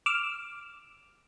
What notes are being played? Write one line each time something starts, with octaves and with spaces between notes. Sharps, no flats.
D6 E6 F6